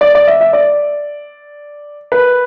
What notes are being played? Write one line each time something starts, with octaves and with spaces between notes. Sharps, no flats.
D5
D5
E5
E5
D5
B4